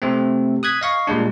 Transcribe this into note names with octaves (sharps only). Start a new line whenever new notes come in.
C3 A3 C4
D#6 F#6 G#6 B6
D#5 F5 C#6
A#2 G3 G#3 D4